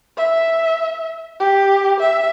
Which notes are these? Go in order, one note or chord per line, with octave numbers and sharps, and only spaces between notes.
E5
G4
E5